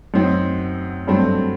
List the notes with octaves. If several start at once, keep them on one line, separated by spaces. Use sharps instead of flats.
F#2 F#3 C4 D#4
G2 F#3 A3 C4